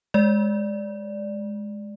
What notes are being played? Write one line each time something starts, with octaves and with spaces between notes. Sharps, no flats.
G#3 D5